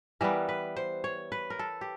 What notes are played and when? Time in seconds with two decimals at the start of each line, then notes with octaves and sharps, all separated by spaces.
0.21 E3 G3 B3 A#4
0.49 B4
0.77 C5
1.04 C#5
1.32 B4
1.50 A#4
1.59 A4
1.81 G4